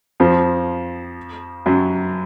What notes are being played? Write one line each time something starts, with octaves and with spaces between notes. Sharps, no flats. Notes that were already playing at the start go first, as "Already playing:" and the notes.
F2 F3
F#2 F#3